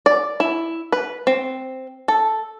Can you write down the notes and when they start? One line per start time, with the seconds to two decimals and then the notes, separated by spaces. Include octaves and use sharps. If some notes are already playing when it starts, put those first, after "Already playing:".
0.06 D5
0.40 E4
0.92 B4
1.27 C4
2.08 A4